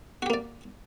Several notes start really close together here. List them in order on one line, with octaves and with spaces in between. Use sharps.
F#4 G4 A#3 D5